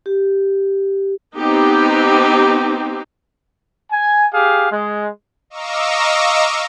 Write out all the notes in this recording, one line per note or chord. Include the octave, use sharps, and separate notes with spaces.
G4
B3 C4 D#4 G4
G#5
G4 G#4 F5
G#3
D#5 F5 A#5 C#6 D6 E6